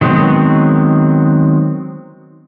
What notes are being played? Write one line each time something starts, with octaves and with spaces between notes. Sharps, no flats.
D#3 F#3 G#3 B3 C4